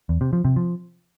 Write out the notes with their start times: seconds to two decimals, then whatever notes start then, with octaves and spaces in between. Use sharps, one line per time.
0.09 E2
0.21 C3
0.33 F3
0.45 C3
0.56 F3